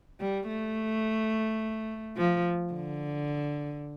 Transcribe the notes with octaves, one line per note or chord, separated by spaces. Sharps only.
G3
A3
F3
D3